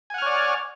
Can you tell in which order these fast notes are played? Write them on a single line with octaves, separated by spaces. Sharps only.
G#5 F#5 F6 C#5 D5